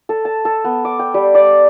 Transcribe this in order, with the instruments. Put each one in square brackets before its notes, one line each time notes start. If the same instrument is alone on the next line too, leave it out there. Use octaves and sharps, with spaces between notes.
[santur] A4
A5
A4
B3
D6
G5
G3
D5